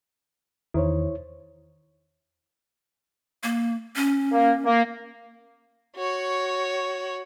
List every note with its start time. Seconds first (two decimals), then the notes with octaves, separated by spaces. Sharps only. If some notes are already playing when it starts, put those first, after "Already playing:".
0.74 E2 D#3 E4 C5 C#5
3.43 A#3
3.96 C#4
4.31 A#3
4.65 A#3
5.96 F#4 C#5